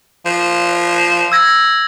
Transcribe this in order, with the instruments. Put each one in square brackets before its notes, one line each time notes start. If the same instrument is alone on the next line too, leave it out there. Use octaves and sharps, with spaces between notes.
[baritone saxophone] F3
[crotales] E6 G#6 A#6